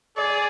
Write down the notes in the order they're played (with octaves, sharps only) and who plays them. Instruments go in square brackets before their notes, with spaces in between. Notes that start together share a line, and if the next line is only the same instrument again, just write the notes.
[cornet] G#4 [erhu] D5